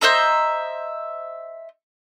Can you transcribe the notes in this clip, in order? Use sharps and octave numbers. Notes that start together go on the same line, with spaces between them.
C5 D#5 E5 A#5